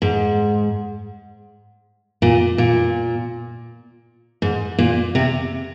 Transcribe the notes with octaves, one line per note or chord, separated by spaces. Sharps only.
G#2
A#2
A#2
G#2
A#2
C3